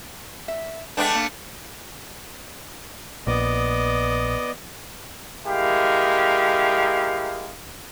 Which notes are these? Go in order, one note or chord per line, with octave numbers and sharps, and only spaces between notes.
E5
G#3 A3 B3 D4 G5 A5
A#3
A#1 B3 D5 D#5
G#3 E4 G4 A#4 F5